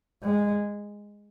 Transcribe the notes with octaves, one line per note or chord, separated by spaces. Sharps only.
G#3